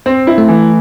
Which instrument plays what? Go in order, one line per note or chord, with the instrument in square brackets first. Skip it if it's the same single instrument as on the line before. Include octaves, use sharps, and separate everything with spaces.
[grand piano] C4
E4
[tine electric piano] A3
[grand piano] E3